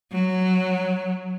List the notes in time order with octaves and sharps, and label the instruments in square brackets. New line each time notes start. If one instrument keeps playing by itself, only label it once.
[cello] F#3